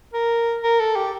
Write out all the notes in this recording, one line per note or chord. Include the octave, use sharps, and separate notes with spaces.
A#4
A#4
A4
G4